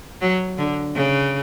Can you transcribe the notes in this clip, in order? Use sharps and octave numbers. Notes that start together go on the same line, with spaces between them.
F#3
D3
C#3